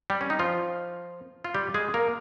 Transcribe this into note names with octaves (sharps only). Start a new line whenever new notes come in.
G3 G4
C#4
D#4
F3 F4
F4
G3 G4
G#3 G#4
A#3 A#4